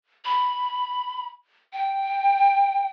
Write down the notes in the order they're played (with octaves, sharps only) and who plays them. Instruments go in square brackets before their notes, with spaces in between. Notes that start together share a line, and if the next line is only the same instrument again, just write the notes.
[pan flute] B5
G5